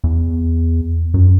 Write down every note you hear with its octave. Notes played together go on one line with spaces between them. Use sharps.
E2
F#2